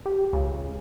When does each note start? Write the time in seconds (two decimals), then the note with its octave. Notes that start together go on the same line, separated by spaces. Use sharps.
0.06 G4
0.33 C#2